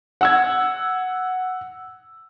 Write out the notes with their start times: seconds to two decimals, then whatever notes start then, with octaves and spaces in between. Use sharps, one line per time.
0.21 F#5 E6 G#6